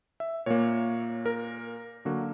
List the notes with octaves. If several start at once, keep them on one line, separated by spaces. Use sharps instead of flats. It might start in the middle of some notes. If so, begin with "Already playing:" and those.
E5
A#2 A#3 C#5
A#4
D3 F#3 A#3 F#4